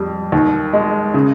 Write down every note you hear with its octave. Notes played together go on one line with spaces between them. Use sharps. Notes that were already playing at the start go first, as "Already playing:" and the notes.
Already playing: F2 G3
D#2
G#3
C#3